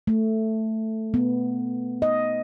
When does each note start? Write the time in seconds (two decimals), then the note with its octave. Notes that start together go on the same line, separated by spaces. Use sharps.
0.07 A3
1.14 B3
2.02 D#5